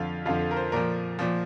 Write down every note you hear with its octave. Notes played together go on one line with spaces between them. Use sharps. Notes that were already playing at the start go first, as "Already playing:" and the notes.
Already playing: F2 D3 F3 F5
F2 D3 F3 F5
A#4
C5
A#2 F3 A#4
A#2 F3